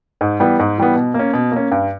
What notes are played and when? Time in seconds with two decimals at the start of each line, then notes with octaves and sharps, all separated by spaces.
0.21 G#2
0.40 E3 G3 B3
0.59 G#2
0.78 E3 G3 B3
0.96 B2
1.14 A#3
1.19 C#4
1.33 B2
1.52 A#3 C#4
1.71 G2